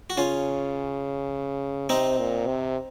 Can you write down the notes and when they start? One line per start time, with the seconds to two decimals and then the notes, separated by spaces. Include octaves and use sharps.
0.10 F#4
0.17 C#3 C#4 F4
1.89 C3 C4 D#4
2.18 A#2
2.47 C3